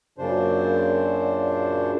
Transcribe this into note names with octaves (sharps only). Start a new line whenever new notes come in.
F#2 A#2 C#3 D4 C5